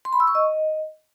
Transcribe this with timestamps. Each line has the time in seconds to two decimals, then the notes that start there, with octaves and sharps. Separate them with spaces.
0.05 C6
0.13 B5
0.20 E6
0.27 C#6
0.35 D#5